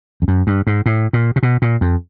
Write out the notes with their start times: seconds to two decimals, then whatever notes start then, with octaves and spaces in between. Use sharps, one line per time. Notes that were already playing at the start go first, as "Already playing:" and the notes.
0.22 F2
0.28 F#2
0.47 G2
0.67 G#2
0.86 A2
1.13 A#2
1.36 C3
1.43 B2
1.62 A#2
1.81 F2